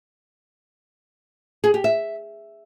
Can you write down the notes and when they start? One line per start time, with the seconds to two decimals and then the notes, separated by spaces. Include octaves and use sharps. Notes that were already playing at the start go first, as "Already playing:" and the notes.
1.64 G#4
1.74 G4
1.84 E5